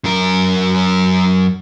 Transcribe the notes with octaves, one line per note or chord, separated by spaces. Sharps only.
F#2 A#4